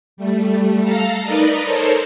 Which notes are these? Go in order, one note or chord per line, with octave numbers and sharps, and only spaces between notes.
G3 A3
A4 F5 A#5
D#4 A#4 B4 D5 D#5
A4 A#4 C5 C#5